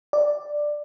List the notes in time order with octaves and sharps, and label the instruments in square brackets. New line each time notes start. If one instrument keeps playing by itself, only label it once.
[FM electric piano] D5